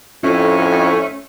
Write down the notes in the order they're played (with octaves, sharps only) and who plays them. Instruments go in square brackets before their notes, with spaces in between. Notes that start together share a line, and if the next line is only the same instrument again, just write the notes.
[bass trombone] F2 [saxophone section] A2 A3 C#4